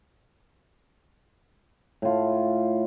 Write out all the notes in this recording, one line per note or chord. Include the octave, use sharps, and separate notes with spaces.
A2 F4